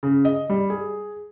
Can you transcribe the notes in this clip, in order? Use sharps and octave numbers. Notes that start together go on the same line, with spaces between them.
C#3
D#5
G3
G#4